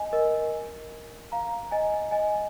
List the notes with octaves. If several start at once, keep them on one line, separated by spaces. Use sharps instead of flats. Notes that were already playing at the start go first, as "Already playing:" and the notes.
Already playing: D#5 G#5
A#4 D#5
F5 A#5
D#5 G#5
D#5 G#5